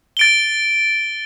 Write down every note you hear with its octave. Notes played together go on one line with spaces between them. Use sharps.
A6 D7 G7